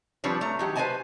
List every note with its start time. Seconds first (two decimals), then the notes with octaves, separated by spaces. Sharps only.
0.24 F3 G3 C4 D4 B4 C#5
0.41 A3 A#5
0.59 D#3 F#3 G4
0.76 B4 C5 D5 D#5 G#5 A5